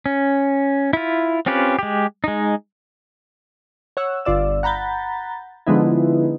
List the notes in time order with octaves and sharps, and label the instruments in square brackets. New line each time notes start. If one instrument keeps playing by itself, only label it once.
[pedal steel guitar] C#4
E4 F4
C4 C#4 F4 G4 B4
G#3 G4
G#3 D#4
[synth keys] C#5 F#5 E6
G1 F4 D5 E6
F#5 A#5 B5 G6 A6
D3 F3 G#3 B3 D#4 E4